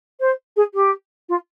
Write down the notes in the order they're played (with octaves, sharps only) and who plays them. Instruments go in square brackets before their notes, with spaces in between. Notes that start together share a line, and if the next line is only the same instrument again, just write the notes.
[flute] C5
G#4
G4
F4